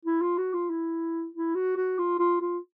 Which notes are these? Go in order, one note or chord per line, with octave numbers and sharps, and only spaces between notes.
E4
F4
F#4
F4
E4
E4
F#4
F#4
F4
F4
F4